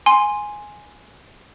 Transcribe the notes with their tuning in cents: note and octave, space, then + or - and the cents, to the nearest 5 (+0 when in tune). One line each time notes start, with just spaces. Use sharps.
G#5 +0 C6 +0